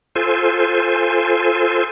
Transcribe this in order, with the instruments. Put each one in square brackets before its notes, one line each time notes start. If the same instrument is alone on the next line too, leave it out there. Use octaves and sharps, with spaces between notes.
[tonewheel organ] F4 A4 C5 G#5